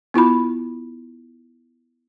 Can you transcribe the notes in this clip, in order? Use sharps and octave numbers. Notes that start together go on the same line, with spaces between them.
B3 E4 F4 B5